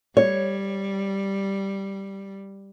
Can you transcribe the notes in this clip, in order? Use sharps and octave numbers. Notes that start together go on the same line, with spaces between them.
G3 C#5